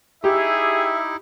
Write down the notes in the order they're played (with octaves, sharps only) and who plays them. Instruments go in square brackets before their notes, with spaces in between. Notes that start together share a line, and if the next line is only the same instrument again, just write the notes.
[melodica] D#4 E4 [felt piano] G4 [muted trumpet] G#4 [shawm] E5